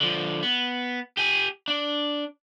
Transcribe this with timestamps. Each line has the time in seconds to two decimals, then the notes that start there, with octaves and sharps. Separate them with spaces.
0.01 D3 F3
0.43 B3
1.17 G4 G#5
1.68 D4